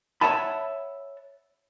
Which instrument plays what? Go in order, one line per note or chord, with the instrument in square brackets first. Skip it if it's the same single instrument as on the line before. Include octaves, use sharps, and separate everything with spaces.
[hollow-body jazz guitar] C#5 D#5 E5 F#5 A5 B5